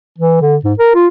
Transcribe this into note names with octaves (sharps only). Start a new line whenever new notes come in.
E3
D3
G#2
A#4
F4